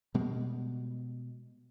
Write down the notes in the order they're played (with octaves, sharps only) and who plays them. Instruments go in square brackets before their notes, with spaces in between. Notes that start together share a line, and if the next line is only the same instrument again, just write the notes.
[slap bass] B2 G3 G#3